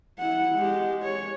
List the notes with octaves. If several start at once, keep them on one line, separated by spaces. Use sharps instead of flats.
E4 F#5
G#3 G4
C#5